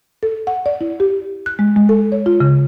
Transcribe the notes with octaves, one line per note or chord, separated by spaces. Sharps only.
A4
F#5
D5
E4
G4
F#6
G#3
G#3
A4
C#5
F4
C#3